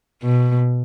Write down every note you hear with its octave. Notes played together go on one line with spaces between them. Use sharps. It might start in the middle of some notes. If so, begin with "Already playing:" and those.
B2